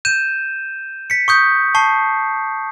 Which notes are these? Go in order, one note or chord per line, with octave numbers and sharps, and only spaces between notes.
G6 D#7 E7
B6 C#7
C#6 D#6 G6
A5 C#6 C7